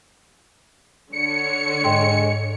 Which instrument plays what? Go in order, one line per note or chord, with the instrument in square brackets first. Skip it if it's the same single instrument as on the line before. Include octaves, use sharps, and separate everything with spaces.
[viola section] D3 C#5 [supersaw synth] C#7
[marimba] G#2 G5 C6 [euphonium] G#3